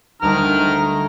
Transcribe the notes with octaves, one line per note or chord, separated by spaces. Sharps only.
D2 D#3 G3 A#5 F6